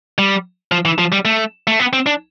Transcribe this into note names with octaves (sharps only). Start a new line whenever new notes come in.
G3
F3
E3
F3
G3
A3
A3
B3
C4
D4